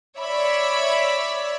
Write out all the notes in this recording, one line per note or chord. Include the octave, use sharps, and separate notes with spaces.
C#5 D5 E5 B5